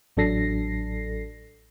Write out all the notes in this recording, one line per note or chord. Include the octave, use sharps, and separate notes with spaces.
A1 F#3 D4 A4 A#6 C7